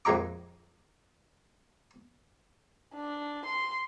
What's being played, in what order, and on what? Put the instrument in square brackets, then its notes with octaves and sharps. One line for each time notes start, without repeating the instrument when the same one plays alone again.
[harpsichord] F2 A#2 G#3 E5 A#5 D6
[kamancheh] D4
C6